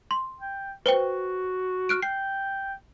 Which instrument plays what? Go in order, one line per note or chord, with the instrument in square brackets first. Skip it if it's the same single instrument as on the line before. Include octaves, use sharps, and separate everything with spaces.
[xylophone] C6
[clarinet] G5
[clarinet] F#4 [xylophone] B4 C5 G5
[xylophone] F6 F#6 D7
[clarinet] G5 [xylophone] C7